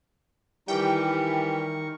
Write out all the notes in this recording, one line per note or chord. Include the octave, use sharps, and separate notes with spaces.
D#3 E3 G3 A#4 G5 C#6